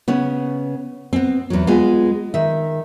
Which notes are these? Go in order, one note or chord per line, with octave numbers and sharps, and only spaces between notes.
C#3 B3 C#4
B3 C4
E2 F#3
G#3 B3 F4 G#4
D#3 E5